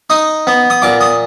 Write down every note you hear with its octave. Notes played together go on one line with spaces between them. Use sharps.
D#4 D#6
B3
D#6
A#2 D6
D#6